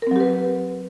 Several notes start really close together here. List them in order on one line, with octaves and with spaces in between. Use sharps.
A#4 C4 F#3 G4 B4